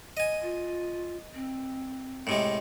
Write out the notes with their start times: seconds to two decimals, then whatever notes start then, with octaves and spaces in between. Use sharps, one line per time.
0.17 D#5 G#5
0.42 F4
1.35 C4
2.27 A2 C3 G#3